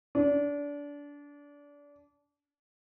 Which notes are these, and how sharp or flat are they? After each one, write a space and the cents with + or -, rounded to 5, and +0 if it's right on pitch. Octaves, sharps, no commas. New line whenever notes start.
D4 -25